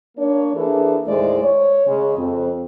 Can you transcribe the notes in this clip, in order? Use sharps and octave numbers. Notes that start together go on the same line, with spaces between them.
A#3 D4 C#5
E3 A#3 D4 E4 G#4 A4
D#2 A2 G#3 E4 C5 D5
C#5
C#3 G#3
F2 C4